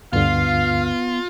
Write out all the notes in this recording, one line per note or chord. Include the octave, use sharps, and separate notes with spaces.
D2 G2 D3 B3 F4 F5